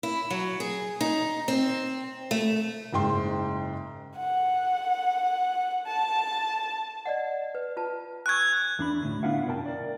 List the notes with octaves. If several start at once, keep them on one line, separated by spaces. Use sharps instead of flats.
E4
F#3
G#4
D#4
C4
A3
F#1 G#2 G5 C6
F#5
A5
D5 D#5 F#5
B4
F4 B4 A5
G#5 C#6 E6 F#6 G#6
E2 D4 B5
D2 A2 D3
B3 D4 E4 F4 F5 F#5
B1 F#2 C3 A#4 G5 A5
A#4 D5